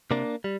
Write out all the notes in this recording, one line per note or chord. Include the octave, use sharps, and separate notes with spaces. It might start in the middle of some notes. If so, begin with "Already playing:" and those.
C3 A#3 D4
G3